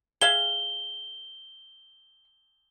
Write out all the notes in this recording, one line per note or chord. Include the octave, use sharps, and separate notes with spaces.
G#4 E5 F5 G7